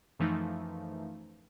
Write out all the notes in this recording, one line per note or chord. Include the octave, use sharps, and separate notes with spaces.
F#2 E3 F3 A3 D#4